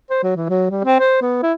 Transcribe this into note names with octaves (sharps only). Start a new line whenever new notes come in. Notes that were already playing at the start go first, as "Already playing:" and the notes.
C5
F#3
E3
F#3
G3
C4
C5
B3
E4